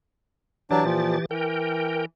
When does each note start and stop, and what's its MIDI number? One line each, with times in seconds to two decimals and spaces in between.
0.71 1.25 52
0.71 0.84 54
0.71 0.84 62
0.71 1.25 67
0.71 1.25 93
0.84 1.18 46
0.84 1.18 53
1.31 2.05 52
1.31 2.05 70
1.31 2.05 79